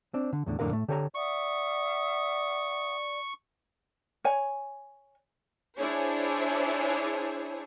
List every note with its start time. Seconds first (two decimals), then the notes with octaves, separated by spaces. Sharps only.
0.14 C4 D4
0.33 D3
0.46 E2 A2 D3
0.59 B1 F2 A2 D3 A#4 F5
0.71 A2 A3
0.88 D3 G4 A4 C#5 F5 A#5
1.15 D5 E5 F#5 C#6 D#6
4.25 C#5 G#5
5.78 D4 E4 G#4 C5 C#5